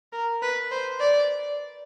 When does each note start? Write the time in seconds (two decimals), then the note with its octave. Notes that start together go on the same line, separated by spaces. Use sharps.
0.13 A#4
0.42 B4
0.71 C5
1.00 D5